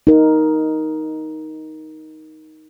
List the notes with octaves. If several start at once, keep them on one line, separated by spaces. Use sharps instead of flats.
D#4 A#4